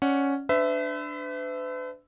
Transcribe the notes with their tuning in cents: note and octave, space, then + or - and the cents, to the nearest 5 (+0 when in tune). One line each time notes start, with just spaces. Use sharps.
C#4 +0 D5 +0 F#5 +0
D4 +0 B4 +45 E5 +0